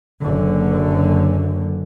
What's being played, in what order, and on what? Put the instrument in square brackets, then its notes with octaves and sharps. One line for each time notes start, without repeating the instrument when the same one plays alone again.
[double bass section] F#1 F#2 D3